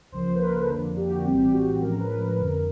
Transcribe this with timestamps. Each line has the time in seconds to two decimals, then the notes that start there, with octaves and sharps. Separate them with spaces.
0.12 C#2 C#3 F3 A#3 C5
0.35 B4
0.41 A#4
0.54 A4
0.69 F2 D3 F3 A#3 D4
0.96 G4
1.10 F#4
1.25 A#1 A2 E3 G3 C4 G4
1.40 G4
1.53 F#4
1.81 A2 F3 G#3 C#4 A#4
2.00 B4
2.10 A#4
2.38 G1 F2 D3 A#4